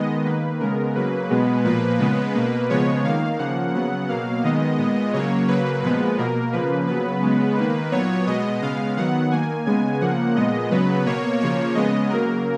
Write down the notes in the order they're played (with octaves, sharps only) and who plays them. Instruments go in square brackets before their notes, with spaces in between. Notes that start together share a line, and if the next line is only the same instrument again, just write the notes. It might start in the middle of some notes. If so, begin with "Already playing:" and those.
Already playing: [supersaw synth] D#3 G#3 B3 D#5
D#3 A#3 B4
C#3 G#3 B3 A#4
C#3 F#3 A#3 B4
B2 G#3 B3
A#2 F3 A#3 B4
C#3 G#3 B3
B2 A#3
C#3 F3 G#3 B3 C#5
D#3 A#3 F5
C#3 F3 A#3 F#5
C#3 F#3 B3 F#5
B2 F#3 A#3 F5
D#3 G#3 B3 D#5
A#2 G#3 B3
C#3 F#3 A#3 C#5
C#3 F#3 A#3 B4
A#2 F3 G#3 B3 B4
B2 A#3 A#4
C#3 F3 A#3 B4
C#3 F#3 B3 B4
C#3 G#3 B3
D#3 A#3 B4
A#2 F#3 B3 C#5
B2 G#3 B3 D#5
C#3 G#3 B3 F5
D#3 F#3 B3 F#5
D#3 A#3 G#5
C#3 G#3 B3 G#5
C#3 F3 A#3 F#5
A#2 G#3 B3 D#5
C#3 F#3 B3 B4
B2 A#3 C#5
C#3 F3 A#3 C#5
C#3 G#3 B3 D#5
C#3 F#3 A#3 A#4